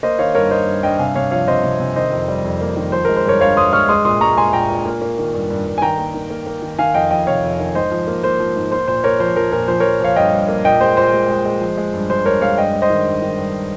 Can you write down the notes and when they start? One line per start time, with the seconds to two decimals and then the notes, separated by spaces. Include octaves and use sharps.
0.03 A#3 C5 D#5
0.19 D#3 C#5 F5
0.35 G2 A#4 C#5
0.51 D#3 C5 D#5
0.67 G2
0.83 G2 D#5 G5
0.99 C3 F5 G#5
1.16 C3 C#5 F5
1.31 F3 C#5 F5
1.48 C3 C5 D#5
1.64 C3
1.80 C3
1.96 D#3 C5 D#5
2.12 F2
2.28 G3
2.44 F2
2.61 A#3
2.77 D#3
2.92 F3 C5
3.05 G#3 A#4
3.16 C5
3.24 G2 A#4 C#5
3.41 G2 C#5 F5
3.57 G2 C6 D#6
3.73 G#3 C#6 F6
3.89 G#3 C6 D#6
4.05 A#2 C6 D#6
4.21 G#3 A#5 C#6
4.37 G#3 G#5 C6
4.53 A#2 G5 A#5
4.70 A#2
4.86 A#3
5.02 A#3
5.18 D#3
5.34 G2
5.50 G2
5.66 G2
5.78 G#5
5.82 D#3 G5 A#5
5.98 A#3
6.14 D#3
6.31 A#3
6.47 A#3
6.62 D#3
6.79 D#3 F5 G#5
6.94 F2 D#5 G5
7.11 F2 D#5 G5
7.27 C3 C#5 F5
7.43 F2
7.60 D#3
7.75 G#2 C5 D#5
7.91 F3
8.07 A#3
8.24 A#3 C5
8.40 F3
8.56 G#2
8.72 A#3 C5
8.88 A#2 C5
9.04 A#3 A#4 C#5
9.20 F3 C5
9.36 F3 A#4
9.52 A#2 A#4
9.68 F3 C5
9.80 F3 A#4 C#5
10.00 F3 C#5 F5
10.16 G2 D#5 G5
10.32 G2
10.49 A#3
10.65 A#2 D#5 G5
10.81 G#3 C5
10.97 A#2 C5
11.13 G#3
11.30 G#3
11.46 G#3
11.61 F3
11.77 G#3
11.94 G2
12.10 G#3 C5
12.26 G#3 A#4 C#5
12.41 G#3 C#5 F5
12.58 G2 D#5 G5
12.74 G#3
12.82 C5 D#5
12.90 D#3
13.06 G2
13.22 D#3
13.38 G2